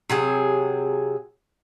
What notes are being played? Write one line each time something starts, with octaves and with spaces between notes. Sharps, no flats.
C3 F#3 G#4